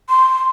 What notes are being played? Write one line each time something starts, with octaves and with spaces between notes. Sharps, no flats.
C6